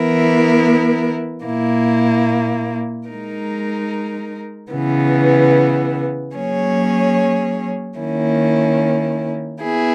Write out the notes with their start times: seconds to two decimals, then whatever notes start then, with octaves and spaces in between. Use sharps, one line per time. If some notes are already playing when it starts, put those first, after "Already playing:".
Already playing: E3 B3 E4 A#4
1.44 A#2 A#3 E4
3.08 G#3 D#4 A#4
4.71 C#3 E3 B3
6.35 F#3 A#3 C#4 G#4 C#5
7.99 D#3 A#3 C#4 E4
9.62 B3 E4 G#4